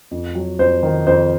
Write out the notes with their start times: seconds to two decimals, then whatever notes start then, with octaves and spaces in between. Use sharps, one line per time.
0.11 F2
0.35 F#3
0.59 F2 C5
0.83 D#3
1.06 F2 C5